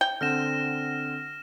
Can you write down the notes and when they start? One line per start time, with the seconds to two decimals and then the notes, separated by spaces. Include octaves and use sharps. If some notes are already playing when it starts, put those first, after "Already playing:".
0.01 G5
0.21 D3 C4 F#5 F6 A#6 E7